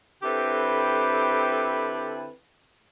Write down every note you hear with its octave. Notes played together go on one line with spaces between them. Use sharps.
D3 C4 E4 G4 A4 B4